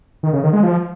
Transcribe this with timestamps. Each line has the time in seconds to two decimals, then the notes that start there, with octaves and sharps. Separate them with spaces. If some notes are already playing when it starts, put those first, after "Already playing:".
0.23 D#3
0.33 C#3
0.44 D#3
0.53 G#3
0.63 F3